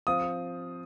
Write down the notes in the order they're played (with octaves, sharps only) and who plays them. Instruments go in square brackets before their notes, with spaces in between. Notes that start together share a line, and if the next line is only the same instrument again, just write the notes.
[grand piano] F3 C4 F4 D#6